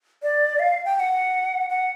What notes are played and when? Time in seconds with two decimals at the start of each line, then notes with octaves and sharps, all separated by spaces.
0.23 D5
0.59 F5
0.85 G5
0.95 G5
1.00 F#5
1.70 F#5